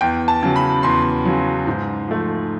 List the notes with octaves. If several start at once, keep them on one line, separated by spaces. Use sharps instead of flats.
E2 G5
A5
C#3 F#3
B5
E2 C6
C#3 F#3
G#2
F3 A3